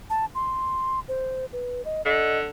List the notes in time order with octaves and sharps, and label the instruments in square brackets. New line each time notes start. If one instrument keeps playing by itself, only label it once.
[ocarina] A5
C6
C5
B4
D#5
[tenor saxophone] D3 [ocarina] D#5